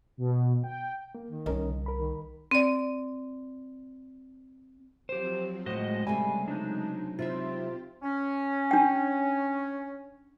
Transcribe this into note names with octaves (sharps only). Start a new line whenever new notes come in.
B2
G5
A#3
D#3
C2 C#4 A#4 D#5
C#3
A#4 B5
D#3
C4 D5
F3 F#3 C4 G4 C5
A2 C#3 G#3 F#4 C5 D#5
C3 G3 A3 G4 G#5
F#3 D4 D#4
C3 C4 E4 F4 G4 E5
C#4
D4 G5